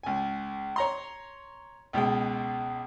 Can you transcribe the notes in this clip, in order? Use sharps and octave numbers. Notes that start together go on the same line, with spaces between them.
C#2 G#5
C#5 A#5 C6
C#2 B2 G#3 G5